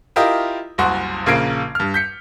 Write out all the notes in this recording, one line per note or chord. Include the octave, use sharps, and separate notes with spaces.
E4 F4 G4 A#4 D#5
F#1 C2 F#2 F#4 C6
A#1 C#3 A#3 G#6 C7 D7
G2 F6
G6 B6 C#7